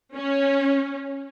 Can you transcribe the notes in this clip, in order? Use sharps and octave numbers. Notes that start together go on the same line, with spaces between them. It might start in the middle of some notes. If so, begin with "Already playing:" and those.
C#4